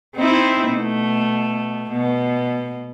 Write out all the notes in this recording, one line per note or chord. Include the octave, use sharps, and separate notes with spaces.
C4 D#4 E4
B2 A3
B2